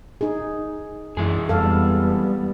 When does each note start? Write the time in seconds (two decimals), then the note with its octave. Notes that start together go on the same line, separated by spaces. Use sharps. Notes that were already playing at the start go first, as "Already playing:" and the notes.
0.21 D#4 G#4
1.17 F#2 E3 G#3 G#4
1.49 F2 G3 B3 A4 F5